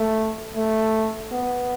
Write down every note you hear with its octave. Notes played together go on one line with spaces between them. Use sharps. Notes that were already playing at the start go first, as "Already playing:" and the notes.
Already playing: A3
A3
B3